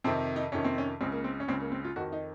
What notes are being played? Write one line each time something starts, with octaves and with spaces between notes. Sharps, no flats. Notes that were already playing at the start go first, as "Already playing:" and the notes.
F2 C3 D#3 C4
D#4
F2 C3 D#3 C#4
C4
C#4
C#2 C#3 C4
A#3
C4
C#4
C#2 C#3 C4
A#3
C4
F4
F2 D#3 F#4
D#4